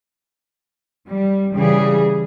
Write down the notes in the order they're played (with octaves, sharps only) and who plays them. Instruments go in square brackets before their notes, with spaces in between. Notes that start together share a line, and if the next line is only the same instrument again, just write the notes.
[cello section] G3
C#3 E3 G3 G#4